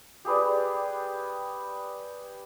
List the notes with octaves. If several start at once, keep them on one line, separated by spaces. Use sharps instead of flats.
G4 G#4 B4 D5